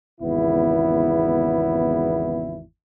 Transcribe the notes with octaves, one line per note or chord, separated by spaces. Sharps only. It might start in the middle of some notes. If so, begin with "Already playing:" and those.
G#1 E2 C#3 B3 E4